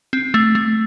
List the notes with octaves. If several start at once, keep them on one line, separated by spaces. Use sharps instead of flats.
C4
A3
A3